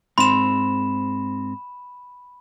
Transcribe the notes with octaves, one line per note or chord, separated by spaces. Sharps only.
G#2 C4 B5 C6 E7